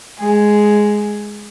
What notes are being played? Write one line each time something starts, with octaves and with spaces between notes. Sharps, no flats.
G#3 G#4